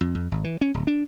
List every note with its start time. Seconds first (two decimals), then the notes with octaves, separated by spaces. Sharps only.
0.01 F2
0.15 F2
0.32 G#1
0.44 E3
0.61 C#4
0.74 D1
0.87 D4